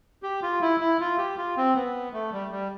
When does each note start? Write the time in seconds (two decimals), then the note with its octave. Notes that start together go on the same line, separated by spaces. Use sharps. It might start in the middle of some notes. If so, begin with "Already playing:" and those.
0.23 G4
0.42 F4
0.61 E4
0.80 E4
1.00 F4
1.18 G4
1.37 F4
1.57 C4
1.75 B3
2.13 A3
2.32 G3
2.51 G3